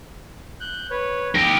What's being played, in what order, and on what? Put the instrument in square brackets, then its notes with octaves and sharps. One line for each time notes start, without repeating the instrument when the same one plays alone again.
[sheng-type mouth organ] F#6 G6
B4 C#5
[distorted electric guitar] G4 A#4 [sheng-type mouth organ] E6